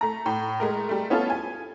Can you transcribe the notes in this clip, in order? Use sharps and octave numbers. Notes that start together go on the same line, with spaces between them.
A3 A#5
A2
G#3 A3 A#4
G3 A3
B3 C#4 E4 F4 A4
G#5